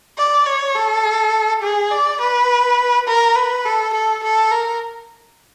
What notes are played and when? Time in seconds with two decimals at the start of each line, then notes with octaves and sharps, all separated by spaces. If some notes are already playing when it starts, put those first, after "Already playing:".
0.18 D5
0.46 C#5
0.75 A4
1.62 G#4
1.91 D5
2.21 B4
3.08 A#4
3.36 B4
3.65 A4
3.94 A4
4.23 A4
4.51 A#4